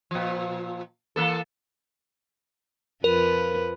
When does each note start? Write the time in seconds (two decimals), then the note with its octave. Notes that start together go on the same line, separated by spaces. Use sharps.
0.11 A#2 F3
1.16 E3 A#3 A4
3.04 F2 F3 A#4 B4